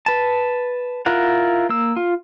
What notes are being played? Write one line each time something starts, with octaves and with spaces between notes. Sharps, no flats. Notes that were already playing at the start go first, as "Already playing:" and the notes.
B4 A5
E4 F4 A#4 F#5
A#3 E6
F4